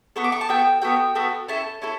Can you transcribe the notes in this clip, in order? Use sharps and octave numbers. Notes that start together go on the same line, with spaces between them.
B3 F#4 A4 C#6
D6
C#6
A5
B3 F#4 A4 G5
B3 F#4 A4 G5
B3 F#4 A4
C#4 E4 A4 A5
C#4 E4 A4